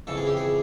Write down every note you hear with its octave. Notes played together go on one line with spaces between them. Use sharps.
F2 C#3 E3 A4
G#4
G4
G#4